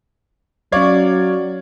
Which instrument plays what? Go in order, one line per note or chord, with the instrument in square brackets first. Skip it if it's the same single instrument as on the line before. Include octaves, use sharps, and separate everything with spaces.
[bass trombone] F#3 [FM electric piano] C#4 G#6 [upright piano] C#5 D5 F5